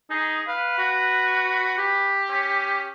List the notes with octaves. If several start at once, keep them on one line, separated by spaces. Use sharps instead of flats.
D#4 G#4
B4 F5
F#4
G4
C#4